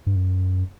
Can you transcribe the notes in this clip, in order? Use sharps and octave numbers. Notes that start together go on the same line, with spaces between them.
G2
F#2